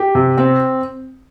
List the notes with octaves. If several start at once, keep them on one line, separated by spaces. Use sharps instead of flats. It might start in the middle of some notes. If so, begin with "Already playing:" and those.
Already playing: G4
C3
C4